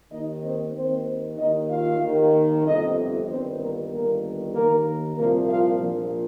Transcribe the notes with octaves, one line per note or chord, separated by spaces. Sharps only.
D#2 D#3 D#4 D#5
C4 C5
D#2 D#3 C4 C5
D#2 D#3 D#4 D#5
F4 F5
D#2 D#3
G1 F2 C3 D#4 D#5
G1 G2 D#3 C4 C5
A#3 A#4
G1 G2 D#3 A#3 A#4
D#2 D#3 A#3 A#4
C2 A#2 F3 A#3 A#4
F4 F5
A#1 A#2 F3